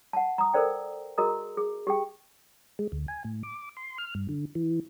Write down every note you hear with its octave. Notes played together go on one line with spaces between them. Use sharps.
F#5 A5
A#5 D#6
A4 A#4 C5 D5 G5
F#4 G#4 A#4 D#5 A#5 D#6
G#4
G4 G#4 G5
G#3
D2
G#5
A2
D6
C6
F6
G2
D3
E3